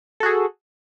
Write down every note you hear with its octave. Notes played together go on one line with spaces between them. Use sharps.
F#4 G#4 A4